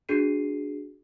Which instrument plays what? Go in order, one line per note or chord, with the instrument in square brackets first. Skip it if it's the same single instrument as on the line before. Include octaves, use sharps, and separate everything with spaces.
[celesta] D4 F#4 G#4 C7 D#7